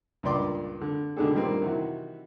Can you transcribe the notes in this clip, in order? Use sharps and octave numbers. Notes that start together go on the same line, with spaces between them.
C#2 G2 A#2 D5 C6 D6
D3
B2 D3 D#3 D4 G#4 A4
G2 A#2 D#3 G3 A#3 C4
C3 D#3 E3 F#4